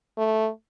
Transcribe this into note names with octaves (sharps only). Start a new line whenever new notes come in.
A3